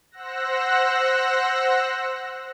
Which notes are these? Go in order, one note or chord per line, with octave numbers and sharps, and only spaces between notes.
C5 F#5 E6 F#6 A#6